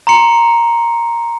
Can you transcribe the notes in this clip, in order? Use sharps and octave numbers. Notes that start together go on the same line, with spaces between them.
A#5 C6 C#7